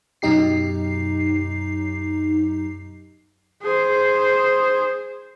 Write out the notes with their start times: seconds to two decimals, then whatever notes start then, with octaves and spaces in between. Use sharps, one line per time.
0.22 F#2 B2 F#3 D#4 G4 C7
3.62 G#4 C5